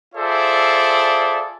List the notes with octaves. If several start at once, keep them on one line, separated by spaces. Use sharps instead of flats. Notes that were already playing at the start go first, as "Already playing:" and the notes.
F4 G#4 A4 C5 D5 E5